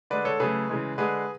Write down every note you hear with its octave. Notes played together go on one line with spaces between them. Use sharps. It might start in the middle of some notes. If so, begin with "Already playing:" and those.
D3 G#3 B4 D5
A4 C#5
C#3 F#3 A3 G#4 B4
C#3 E3 G#3
D3 G#3 G#4 B4